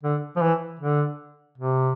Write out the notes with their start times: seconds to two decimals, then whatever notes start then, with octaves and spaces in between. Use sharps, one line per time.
0.03 D3
0.37 F3
0.42 E3
0.80 D3
1.58 C3